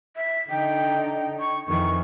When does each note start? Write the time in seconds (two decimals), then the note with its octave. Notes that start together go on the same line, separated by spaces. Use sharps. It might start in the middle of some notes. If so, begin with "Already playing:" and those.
0.16 E5
0.50 D3 D#4 G5
1.39 C#6
1.68 F2 D#3 E3 C#6